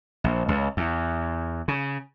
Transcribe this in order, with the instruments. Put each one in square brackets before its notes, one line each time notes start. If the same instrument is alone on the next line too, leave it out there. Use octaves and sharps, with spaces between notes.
[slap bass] A#1
C#2
E2
C#3